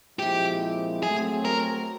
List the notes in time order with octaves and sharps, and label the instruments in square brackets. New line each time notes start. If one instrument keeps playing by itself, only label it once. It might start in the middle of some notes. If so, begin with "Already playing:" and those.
[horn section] A#2 F3 G#3 C4 E4 [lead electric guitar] G4
[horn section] F#3 A3 C4 [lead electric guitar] G#4
[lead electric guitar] A#4